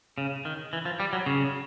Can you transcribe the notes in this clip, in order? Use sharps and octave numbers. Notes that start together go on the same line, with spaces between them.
C#3
D#3
E3
F3
G3
F#3
C#3